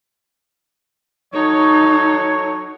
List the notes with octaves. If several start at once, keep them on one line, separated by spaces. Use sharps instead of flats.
F#3 D#4 A4 C#5